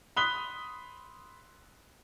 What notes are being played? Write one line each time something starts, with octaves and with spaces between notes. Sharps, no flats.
B5 C6 D#6 F#6 B6 G7